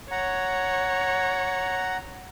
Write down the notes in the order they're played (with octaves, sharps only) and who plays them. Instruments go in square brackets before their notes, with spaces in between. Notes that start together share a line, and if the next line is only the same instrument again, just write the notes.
[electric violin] C#5 [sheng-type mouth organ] F#5 A#5